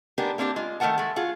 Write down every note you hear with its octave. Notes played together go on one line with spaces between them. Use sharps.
G#3 A#3 B3 D4 G4 A#4
A#3 C4 D4 E4 G4
G#3 F4
D#3 A3 A4 A#4 F#5 A5
G#3 A3
F4 F#4 G#4